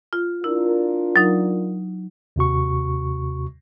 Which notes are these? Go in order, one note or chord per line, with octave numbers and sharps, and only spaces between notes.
F4
D4 E4 F4 A#4
F#3 D#4
D#2 C3 F#4 C#6